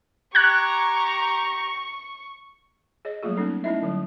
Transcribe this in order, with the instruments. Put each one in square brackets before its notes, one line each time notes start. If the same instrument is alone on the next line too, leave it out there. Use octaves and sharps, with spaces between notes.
[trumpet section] G4 A#5 [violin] C#6 [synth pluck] F#6 G#6
[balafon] G#4 C#5 D#5
F#3 G3 A3 A#3 F4 G#4
A#3 B3 C#4 D#4 A4
A3 C#4 D#4 E4 D#5 E5
D3 F#3 G3